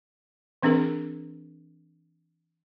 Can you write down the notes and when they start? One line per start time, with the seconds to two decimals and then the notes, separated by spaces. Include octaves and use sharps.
0.62 E3 C4 D4 G#4 A#4